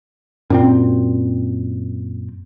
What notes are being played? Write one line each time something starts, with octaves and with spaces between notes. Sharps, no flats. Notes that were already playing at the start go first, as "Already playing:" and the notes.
F#2 A#2 C4